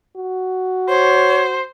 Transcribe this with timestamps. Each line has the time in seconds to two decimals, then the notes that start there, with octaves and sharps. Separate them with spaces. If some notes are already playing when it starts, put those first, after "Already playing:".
0.16 F#4
0.89 C5 C#5